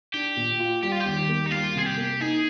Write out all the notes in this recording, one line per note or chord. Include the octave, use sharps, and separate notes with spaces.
D4 G4
A#2
F4
G3 G4
F4
G4
D#2
A#3
D#4
G3 F4
C3 G#4
G4
A#3
D#4 G#4